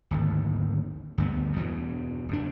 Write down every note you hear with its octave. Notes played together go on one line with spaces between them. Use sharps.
D1 G#1 D#2
D2 G2 B3
E2 G2 B2 E3
F#1 G2 D4